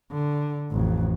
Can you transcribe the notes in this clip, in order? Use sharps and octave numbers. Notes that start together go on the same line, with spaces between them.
D3
A1 F2